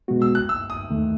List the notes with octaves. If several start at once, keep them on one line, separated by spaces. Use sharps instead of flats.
B2 G#3 B3 F#4
E6
F#6
E6
D#6
D#2 D#3 A3